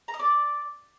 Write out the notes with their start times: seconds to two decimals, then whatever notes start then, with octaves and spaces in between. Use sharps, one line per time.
0.08 A#5
0.14 D#5
0.19 D5